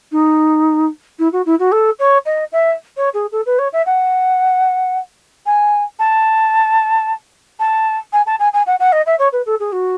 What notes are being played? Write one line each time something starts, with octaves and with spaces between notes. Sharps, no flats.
D#4
E4
F#4
E4
F#4
A4
C#5
D#5
E5
C#5
G#4
A4
B4
C#5
E5
F#5
G#5
A5
A5
G#5
A5
G#5
G#5
F#5
F#5
D#5
E5
C#5
B4
A4
G#4
F#4